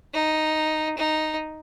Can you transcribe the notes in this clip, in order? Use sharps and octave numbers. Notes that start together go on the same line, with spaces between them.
D#4
D#4